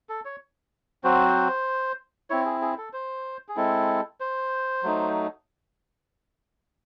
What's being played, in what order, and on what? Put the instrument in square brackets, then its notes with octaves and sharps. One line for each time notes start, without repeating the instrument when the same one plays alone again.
[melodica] A4
C#5
F#3 C4 F#4 C5
C4 E4 C#5
G#4
G#4
A4
C5
G#4
G#3 C4 E4 A4
C5
F#3 A3 D#4